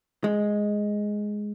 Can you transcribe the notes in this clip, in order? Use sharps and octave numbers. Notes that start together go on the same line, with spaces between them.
G#3